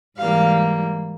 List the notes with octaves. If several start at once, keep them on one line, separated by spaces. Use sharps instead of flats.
G#2 E3 G3 A#3 F5